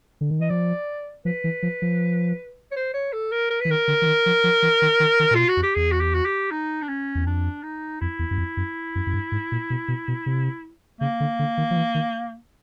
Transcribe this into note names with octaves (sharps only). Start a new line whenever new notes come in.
D3
D#3
E3 D#5
F3 D5
F3 B4
E3
F3
F3
C#5
C5
C#5
A4
A#4
A#4
E3 B4
D#3 A#4
D3
E3
D#3
F3
F3
E3
D#3
D#3
D#3
A#2
B2 F4
F#4
F2
G4
E2 G#4
F#4
G4
F#4
G4
D#4
D4
C#4
E2
F2 D4
D#4
F2 E4
E2
F#2
F2
F#2
F#2
F#2
G2
G#2
A#2
B2
B2
B2
C3
C#3 A#3
D3
D3
D#3
F3
E3
D#3